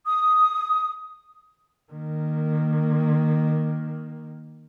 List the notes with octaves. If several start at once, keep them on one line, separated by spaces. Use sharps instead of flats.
D#6
D#3 A#3